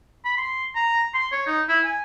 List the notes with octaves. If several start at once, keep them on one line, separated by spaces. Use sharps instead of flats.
B5
C6
A#5
C6
C#5
D#4
E4
G#5